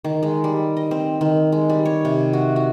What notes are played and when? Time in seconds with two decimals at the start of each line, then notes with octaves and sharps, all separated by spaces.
0.04 D#3
0.23 G#3
0.44 G3
0.77 D#5
0.91 C4
1.21 D#3
1.52 G#3
1.69 G3
1.85 C#5
2.05 C3
2.33 F#4
2.56 F#4